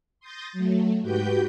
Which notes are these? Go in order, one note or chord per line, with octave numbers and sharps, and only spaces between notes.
C6 D#6 G6 A6 A#6
F#3 A3
G#2 F#4 G4 B4 G5 G6